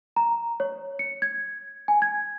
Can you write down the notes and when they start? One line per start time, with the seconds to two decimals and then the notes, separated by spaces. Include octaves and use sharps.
0.16 A#5
0.60 C#5
0.99 C#7
1.22 G#6
1.88 G#5
2.02 G#6